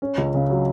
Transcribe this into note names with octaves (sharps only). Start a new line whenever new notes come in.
C#4
C#2
C#3
F#3